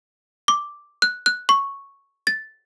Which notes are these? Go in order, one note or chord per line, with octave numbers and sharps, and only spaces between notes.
D6
F#6
F#6
C#6
A6